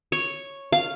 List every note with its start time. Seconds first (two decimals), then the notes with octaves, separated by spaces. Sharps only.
0.12 C#5
0.72 F5